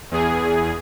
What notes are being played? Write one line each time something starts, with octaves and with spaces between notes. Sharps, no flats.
E2 G#4